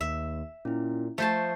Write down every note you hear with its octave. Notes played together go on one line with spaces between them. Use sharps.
D#2 E5
A#2 C#4 E4
F3 A3 C5 A5 C#6 G6 C7